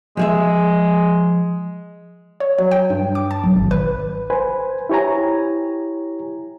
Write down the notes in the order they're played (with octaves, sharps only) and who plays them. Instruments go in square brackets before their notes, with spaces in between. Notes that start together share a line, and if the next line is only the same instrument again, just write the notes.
[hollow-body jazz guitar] F3 G#4 E5 [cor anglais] G#3
[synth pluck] C#5
F#3
G5
G2
D6
A5
B1
G#1
B4
[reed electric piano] B4 C5 G#5
E4 G4 C#5 G#5 A#5